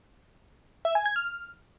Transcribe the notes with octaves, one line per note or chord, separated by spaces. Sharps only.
E5
G#5
G#6
F6